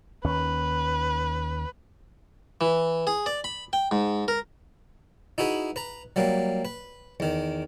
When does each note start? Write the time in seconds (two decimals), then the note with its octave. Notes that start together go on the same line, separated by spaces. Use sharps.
0.25 D#2 D#3 C#4 B4
2.61 E3
3.07 G#4
3.26 D5
3.44 B5
3.73 G5
3.91 G#2
4.28 A#4
5.38 D#4 E4 F#4 G#4 B4
5.76 B4 A#5
6.16 F#3 G3 A#3
6.65 B4
7.20 E2 D#3